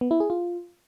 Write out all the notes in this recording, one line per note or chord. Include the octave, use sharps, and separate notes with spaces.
B3
E4
G#4
F4